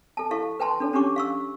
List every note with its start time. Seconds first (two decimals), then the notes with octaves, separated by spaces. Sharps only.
0.17 A4 A5
0.31 E4 A4 F5 C#6
0.60 B4 G5 A5 C6
0.80 D4 A4 C#5
0.93 C#4 D4 G4 C#6 D6
1.16 F5 C#6 E6